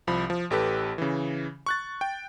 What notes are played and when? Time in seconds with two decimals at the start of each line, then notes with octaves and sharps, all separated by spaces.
0.07 C2 F3 B5
0.30 F3
0.51 A1 G4 A4 B4
0.98 C#3 E3
1.66 C#6 F#6 A6
2.01 G5